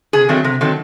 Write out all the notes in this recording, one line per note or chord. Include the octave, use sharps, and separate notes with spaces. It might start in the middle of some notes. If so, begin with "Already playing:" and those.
C3 G#4
D#3 F#3 A3 C4
C3
D#3 F#3 A3 C4